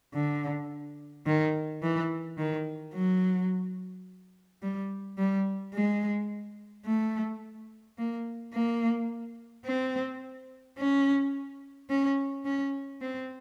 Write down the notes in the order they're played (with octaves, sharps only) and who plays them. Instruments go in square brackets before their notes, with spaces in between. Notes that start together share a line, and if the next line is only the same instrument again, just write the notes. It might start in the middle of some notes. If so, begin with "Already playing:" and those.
[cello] D3
D#3
E3
D#3
F#3
G3
G3
G#3
A3
A#3
A#3
C4
C#4
C#4
C#4
C4